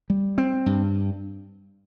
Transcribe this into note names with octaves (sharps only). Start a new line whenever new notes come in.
G3
C4
G2